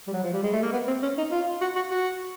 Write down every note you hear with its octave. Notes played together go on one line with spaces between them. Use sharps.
G3
F#3
F3
G3
G#3
A3
A#3
B3
C4
C#4
D#4
F4
F#4
F#4
F#4